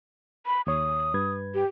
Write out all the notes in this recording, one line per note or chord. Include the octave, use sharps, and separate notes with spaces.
B5
D#2 C#5 D#6
G2 B4 G#6
G4